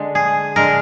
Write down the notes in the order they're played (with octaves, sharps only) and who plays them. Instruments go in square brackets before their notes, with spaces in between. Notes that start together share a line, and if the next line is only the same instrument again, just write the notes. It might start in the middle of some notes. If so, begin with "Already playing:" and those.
Already playing: [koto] D3 G#3
G#4
D3 G#3 A#4